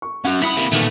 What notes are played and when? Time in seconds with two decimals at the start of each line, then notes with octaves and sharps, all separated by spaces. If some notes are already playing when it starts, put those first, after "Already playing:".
0.02 C#6
0.25 C#4 F#4 F#5
0.42 G2 E4 F#5 B5 D#6
0.57 C3 A#3
0.72 A#2 D#3 A3 B3